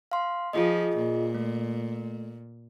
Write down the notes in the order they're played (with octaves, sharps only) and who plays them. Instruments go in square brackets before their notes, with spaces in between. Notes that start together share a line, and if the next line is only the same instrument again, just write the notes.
[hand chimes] F5 C6
[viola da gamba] F3 [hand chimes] F4 G#4 D#5
[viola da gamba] A#2
[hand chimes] A3